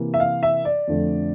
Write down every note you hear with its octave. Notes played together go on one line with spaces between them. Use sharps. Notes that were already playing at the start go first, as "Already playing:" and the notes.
Already playing: C3 E3 A#3
E5
F5
E5
D5
F2 D3 A3